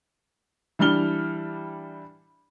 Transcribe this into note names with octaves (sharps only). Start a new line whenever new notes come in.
E3 G3 D4 F6 G7